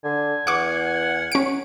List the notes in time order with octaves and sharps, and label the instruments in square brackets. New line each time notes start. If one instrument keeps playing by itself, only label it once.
[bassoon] D3 [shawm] G#5
[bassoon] E2 [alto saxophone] F#5 [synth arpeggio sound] C#6 D6
[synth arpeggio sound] C#4 D7